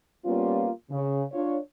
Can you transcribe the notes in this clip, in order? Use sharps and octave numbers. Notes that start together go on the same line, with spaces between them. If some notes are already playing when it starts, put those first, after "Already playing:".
G3 A#3 B3 C#4 F4
C#3
D4 F4 C#5